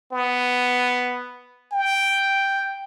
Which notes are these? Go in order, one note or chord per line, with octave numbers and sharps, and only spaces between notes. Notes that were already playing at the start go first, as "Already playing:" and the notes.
B3
G5